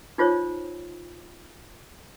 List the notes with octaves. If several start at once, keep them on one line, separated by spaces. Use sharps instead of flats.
D#4 F4 C5 C#5